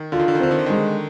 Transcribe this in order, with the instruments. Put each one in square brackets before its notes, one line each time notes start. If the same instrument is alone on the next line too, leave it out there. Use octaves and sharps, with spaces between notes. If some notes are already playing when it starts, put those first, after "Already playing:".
Already playing: [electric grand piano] D#3
[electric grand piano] D3 [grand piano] F4
[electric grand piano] D#3
D3
D#3
[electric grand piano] D3 [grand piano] C4
[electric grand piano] D#3
D3
D#3
[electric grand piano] D3 [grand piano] G#3